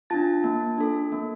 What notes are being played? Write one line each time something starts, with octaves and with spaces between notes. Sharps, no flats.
D4 F4 A5 A6
A#3
D4 A4
A#3